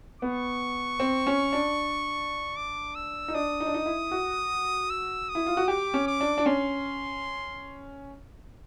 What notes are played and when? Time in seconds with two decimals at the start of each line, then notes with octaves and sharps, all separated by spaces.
0.22 B3 C#6
1.00 C4
1.27 C#4
1.53 D4
2.56 D6
2.95 E6
3.28 D#4
3.34 D4 D#6
3.60 D#4
3.67 D4
3.74 D#4
3.86 E4
4.11 F#4
4.90 E6
5.29 D#6
5.35 E4
5.46 F4
5.57 F#4
5.68 G4 D6
5.94 C#4
6.07 D6
6.21 D4
6.38 D4
6.46 C#4 C6